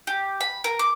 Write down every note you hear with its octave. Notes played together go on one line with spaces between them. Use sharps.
G4
B5
A#4
D6